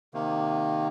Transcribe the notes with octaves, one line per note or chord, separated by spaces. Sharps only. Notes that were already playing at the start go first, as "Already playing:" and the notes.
C3 D#3 A#3